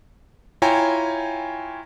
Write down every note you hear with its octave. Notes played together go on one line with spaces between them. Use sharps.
E4 F4 C#5 G5 G#5 A#5